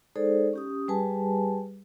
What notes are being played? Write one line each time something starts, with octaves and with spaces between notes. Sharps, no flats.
G#3 D#4 G#4 A4 C5 D5
C#4 G4 D#6
G3 G4 G#4 B4 G#5 A5